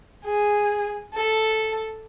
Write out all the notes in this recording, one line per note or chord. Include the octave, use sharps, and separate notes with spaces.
G#4
A4